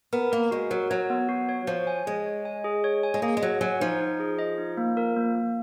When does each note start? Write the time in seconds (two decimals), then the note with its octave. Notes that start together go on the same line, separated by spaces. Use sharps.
0.13 B3 A#4
0.32 A#3 A#4
0.51 G#3 F#4
0.71 F#3 A#4
0.90 F#3 C#5
1.10 B3
1.29 F#4
1.49 C#5
1.67 F3 C#5
1.87 G#5
2.07 G#3 G#4
2.26 C#5
2.45 G#5
2.64 G#4
2.84 C#5
3.03 G#5
3.14 G#3
3.22 A#3 G#4
3.37 G#3
3.42 F#3 D#5
3.61 F#3 G#5
3.81 F3 D#4
4.00 D#4
4.20 G#4
4.39 D#5
4.58 D#4
4.77 A#3
4.97 A#4
5.16 A#3
5.35 A#3